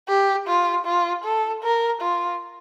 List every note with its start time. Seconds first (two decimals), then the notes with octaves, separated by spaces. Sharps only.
0.09 G4
0.48 F4
0.86 F4
1.24 A4
1.63 A#4
2.01 F4